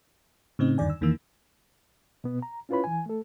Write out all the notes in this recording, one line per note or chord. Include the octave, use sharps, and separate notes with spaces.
A2 C#3 C4 D#4
E2 G2 D3 D#3 D5 G#5
E6
E2 D#3 E3 A#3 E6
B2 B3
A#5
C#4 E4 F4 B4 C#5 B5
E3 G#5
A3 A4